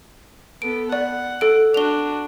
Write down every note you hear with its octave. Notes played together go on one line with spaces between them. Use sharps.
B3 A4 D7
D5 F#5
A4 D7
D4 F#4 F7 G7